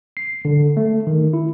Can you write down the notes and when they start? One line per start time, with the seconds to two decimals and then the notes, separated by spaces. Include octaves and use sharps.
0.17 C7
0.45 D3
0.77 A3
1.07 D#3
1.33 E4